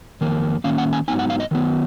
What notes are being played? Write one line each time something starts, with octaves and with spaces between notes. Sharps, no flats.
F2 D#3 A#3
D#3 A#3 C#4 F5
F#5
G#5
G#2 F#3 B3 D#4 G#5
F#5
F5
D#5
D#3 F#3 B3